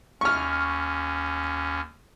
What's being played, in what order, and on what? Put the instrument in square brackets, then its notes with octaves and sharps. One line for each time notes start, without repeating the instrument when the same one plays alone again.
[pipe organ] D#2 C#4 [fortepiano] C#6 F6